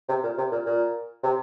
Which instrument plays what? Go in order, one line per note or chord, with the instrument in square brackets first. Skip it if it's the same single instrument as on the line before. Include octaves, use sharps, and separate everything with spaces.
[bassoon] C3
A#2
C3
A#2
A#2
C3